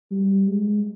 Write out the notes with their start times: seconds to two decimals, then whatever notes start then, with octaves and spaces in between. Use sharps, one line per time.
0.11 G3
0.47 G#3